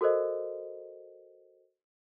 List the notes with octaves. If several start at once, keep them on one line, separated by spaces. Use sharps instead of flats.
F#4 A4 A#4 C5 D#5